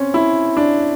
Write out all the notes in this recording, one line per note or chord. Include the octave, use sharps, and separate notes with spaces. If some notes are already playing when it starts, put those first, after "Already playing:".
Already playing: C4 C#4
E4
D4